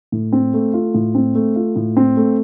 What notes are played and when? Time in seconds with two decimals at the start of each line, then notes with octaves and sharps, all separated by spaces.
0.12 A2
0.32 C4
0.54 A3
0.74 F4
0.94 A2
1.15 C4
1.35 A3
1.56 F4
1.76 A2
1.97 C4
2.17 A3